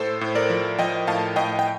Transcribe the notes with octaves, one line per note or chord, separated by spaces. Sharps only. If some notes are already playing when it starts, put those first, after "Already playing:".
Already playing: A2 A4 C5
A2
A#4 D5
F3
F3 D#5 G5
A2 F5 A5
A2 D#5 G5
G5